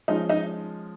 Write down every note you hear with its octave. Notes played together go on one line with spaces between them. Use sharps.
F3 G#3 C#4 D#4
D#4